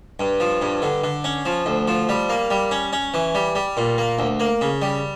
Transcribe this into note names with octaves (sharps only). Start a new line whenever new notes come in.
G2
F3
G2
D3
D3
C#4
F3
D2
F3
G3
A#3
G3
C#4
C#4
E3
G3
G3
A#2
A#3
D2
A#3
C#3
G3